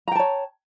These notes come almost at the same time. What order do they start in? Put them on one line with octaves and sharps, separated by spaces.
A#5 G5 A5 C#5